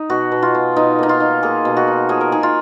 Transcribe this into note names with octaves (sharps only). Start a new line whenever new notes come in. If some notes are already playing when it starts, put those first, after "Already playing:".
Already playing: D#4
B2 F#4
B2
F4
B2
B2 D#4
A#3 D#4
F4
D#4
A#3 G#4
B2
F#4
D#4
F3 G#4
A#4
D#4 G#4
F4